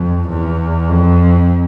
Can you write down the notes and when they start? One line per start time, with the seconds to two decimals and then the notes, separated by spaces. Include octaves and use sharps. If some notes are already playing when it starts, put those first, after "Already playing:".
Already playing: F2
0.29 E2
0.89 F2